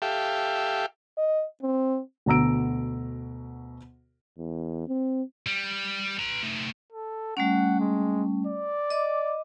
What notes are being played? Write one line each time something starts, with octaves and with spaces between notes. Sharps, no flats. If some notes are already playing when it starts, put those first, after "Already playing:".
G4 A4 E5 F5 G5
D#5
C4
D2 B2 A#5 E6 D7
E2
C4
G3
B4 A#5
A3 D#4
A4
G3 A3 C#4 F#5
G#3
D5
D#5 D6